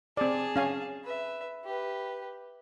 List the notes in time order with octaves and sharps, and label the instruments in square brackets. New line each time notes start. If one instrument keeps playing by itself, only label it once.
[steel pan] C4 D5 [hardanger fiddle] G#4 A5
[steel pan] C#4 F5 G#5
[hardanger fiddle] B4 E5
G4 B4